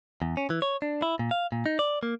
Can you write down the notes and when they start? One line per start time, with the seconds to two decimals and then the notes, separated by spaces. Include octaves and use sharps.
0.22 E2
0.37 C#4
0.50 E3
0.62 C#5
0.82 D4
1.02 E4
1.19 A#2
1.31 F5
1.52 A#2
1.66 D#4
1.79 D5
2.03 A#3